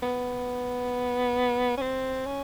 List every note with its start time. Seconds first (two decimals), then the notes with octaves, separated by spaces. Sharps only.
0.03 B3
1.77 C#4
1.81 C4
2.26 C#4